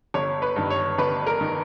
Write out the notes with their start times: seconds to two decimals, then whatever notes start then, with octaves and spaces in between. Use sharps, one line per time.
0.14 G1 C#5
0.42 B4
0.56 G2 D#3
0.70 C#5
0.98 G1 B4
1.27 A#4
1.41 D#3